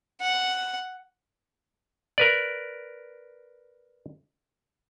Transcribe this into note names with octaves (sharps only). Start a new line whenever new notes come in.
F#5
A#4 B4 D5